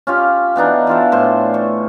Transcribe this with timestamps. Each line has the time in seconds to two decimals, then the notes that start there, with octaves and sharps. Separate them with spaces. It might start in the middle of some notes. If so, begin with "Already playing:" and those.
0.07 C#4 F4 G4
0.56 E3 B3 D4 D#4
0.87 E3 F4 A4
1.12 A2 C5
1.54 C#6